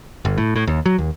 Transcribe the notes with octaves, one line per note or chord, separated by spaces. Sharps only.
G1
A2
A2
D#2
F#3
D#2